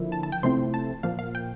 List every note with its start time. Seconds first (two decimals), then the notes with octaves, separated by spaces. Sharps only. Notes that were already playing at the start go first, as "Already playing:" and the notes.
Already playing: D3 F3 A#3 E4
0.12 A5
0.23 A5
0.32 G5
0.43 C3 F3 A3 C4 E4 C6
0.74 A5
1.03 A#2 F3 A#3 F5
1.19 F5
1.35 G5